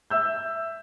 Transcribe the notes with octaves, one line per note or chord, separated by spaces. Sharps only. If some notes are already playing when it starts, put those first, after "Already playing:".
E5 E6 G6